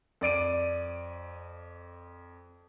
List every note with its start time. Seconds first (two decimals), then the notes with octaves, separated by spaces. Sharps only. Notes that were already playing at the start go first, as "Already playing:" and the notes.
0.21 F2 D5 D7 D#7